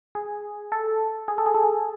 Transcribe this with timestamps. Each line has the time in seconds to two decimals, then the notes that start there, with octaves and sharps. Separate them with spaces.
0.15 G#4
0.72 A4
1.28 G#4
1.38 A4
1.46 G#4
1.54 A4
1.63 G#4